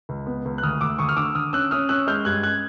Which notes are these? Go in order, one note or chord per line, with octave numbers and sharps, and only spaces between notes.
C#2
B3
C#2
F#6
D2 D#6 F6
D2 D6 E6
D2 C#6 D#6
F6
D3 D6 E6
D3 D#6 F6
C#4 E6 F#6
C#4 D#6 F6
C#4 E6 F#6
G#3 F6 G6
G2 F#6 G#6
F#6 G#6